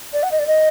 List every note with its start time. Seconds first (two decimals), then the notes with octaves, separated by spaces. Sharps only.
0.13 D5
0.23 F#5
0.31 D#5
0.39 D5
0.47 D#5